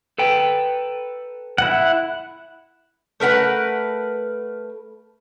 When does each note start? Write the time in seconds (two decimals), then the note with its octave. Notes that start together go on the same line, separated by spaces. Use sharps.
0.18 A4 B4 G5
1.58 E4 F#5
3.20 A3 A#4 B4 F#5